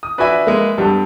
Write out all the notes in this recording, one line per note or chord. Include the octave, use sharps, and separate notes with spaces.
D#6
D4 F#4 B4 E5 G#5
G#3 A#3
G2 G3 B3 A4